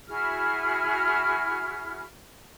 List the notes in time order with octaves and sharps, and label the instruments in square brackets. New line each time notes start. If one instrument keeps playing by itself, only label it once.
[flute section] E4 F#4 G#4 F6